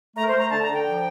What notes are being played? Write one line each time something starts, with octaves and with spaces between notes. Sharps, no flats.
A3 A#5
A#4
C5
A3
A#5
D3 A5
A#5
D3
G5
F3